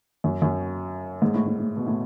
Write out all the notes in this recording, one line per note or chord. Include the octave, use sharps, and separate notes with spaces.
F#2
F#2
G#2
A2
A2
A2
B2
A2